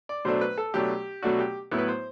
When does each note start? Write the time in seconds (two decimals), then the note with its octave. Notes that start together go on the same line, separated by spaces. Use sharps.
0.09 D5
0.25 B2 F#3 A3 D4 C5
0.41 B4
0.58 A4
0.74 B2 F#3 A3 D4 G4
1.23 B2 F#3 A3 D4 F#4
1.39 G4
1.71 A2 F#3 B3 E4
1.78 B4
1.88 C5